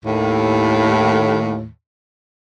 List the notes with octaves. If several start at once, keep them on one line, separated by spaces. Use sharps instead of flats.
D#2 A2